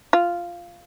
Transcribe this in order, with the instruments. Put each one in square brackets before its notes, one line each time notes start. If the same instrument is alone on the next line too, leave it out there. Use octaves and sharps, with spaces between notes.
[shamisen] F4